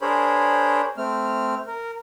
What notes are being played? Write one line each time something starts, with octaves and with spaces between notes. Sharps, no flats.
D4 G#4 A#4 C5 C#5 B5
A3 C4 F6
A#4